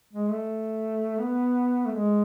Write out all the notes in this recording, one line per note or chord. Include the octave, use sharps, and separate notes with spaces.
G#3
A3
B3
A3
G#3